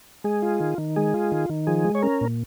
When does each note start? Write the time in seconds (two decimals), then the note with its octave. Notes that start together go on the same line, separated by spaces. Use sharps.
0.24 G#3 G#4
0.42 F4
0.60 D#3
0.78 D#3
0.96 G#3 G#4
1.14 F4
1.32 D#3
1.49 D#3
1.67 F3 G#4
1.85 G#3
1.95 C#5
2.03 C#4 A#4
2.21 A#2